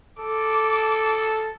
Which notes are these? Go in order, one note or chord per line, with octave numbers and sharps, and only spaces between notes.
A4 D6